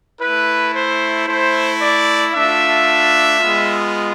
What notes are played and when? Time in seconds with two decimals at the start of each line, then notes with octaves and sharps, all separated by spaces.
0.21 A3 E4 B4
0.75 C5
1.27 A3 E4 C5
1.81 D5
2.34 A3 D4 F4 E5
3.41 G#3 B3 F4